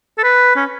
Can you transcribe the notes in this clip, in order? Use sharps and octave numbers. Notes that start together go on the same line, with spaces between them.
A4
B4
C#4